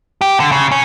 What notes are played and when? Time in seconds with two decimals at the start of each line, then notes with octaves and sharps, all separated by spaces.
0.21 G4
0.40 D3
0.52 C#3
0.72 C#4